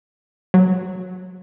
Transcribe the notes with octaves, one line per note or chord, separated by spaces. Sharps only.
F#3